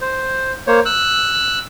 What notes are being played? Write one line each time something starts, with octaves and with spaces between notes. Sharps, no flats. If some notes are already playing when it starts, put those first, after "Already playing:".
C5
A#3 C5 C#5
E6 F#6